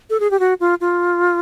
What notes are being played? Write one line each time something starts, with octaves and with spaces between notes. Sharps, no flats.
A4
G#4
G4
F#4
F4
F4